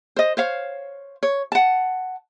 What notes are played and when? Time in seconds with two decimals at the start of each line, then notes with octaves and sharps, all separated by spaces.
0.16 C5 D#5
0.37 C5 C#5 F5
1.23 C#5
1.52 F#5 A5